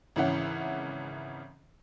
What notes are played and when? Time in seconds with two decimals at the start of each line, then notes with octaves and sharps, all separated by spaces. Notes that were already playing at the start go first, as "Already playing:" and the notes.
0.16 G#1 C#3 E3 C#4 E5 F#5